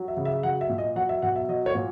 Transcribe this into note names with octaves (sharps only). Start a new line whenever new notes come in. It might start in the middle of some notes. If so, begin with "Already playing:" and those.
Already playing: F#3
E5
C#3
E5
F#3 F#5
E5
A#2
D#5
F#3 F#5
E5
B2 F#5
E5
F#3 D#5
C#5
A#2